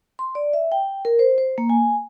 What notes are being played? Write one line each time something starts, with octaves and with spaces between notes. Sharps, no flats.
C6
D5
E5
G5
A#4
C5
C5
A#3
G#5